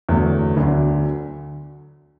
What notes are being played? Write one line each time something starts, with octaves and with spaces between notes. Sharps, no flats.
E2 D3 F#3 A3
D2 D3 F#3 D4